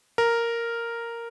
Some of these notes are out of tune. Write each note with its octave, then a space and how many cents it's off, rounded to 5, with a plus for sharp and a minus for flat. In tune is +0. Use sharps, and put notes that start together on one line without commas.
A#4 -5